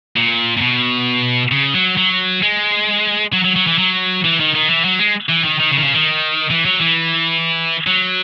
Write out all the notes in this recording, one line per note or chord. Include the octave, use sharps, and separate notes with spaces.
A#2
A#2
B2
C#3
F#3
F#3
G#3
F#3
F#3
F#3
E3
F#3
E3
D#3
D#3
E3
F#3
G#3
E3
D#3
D#3
C#3
D#3
C#3
D#3
E3
F#3
E3
F#3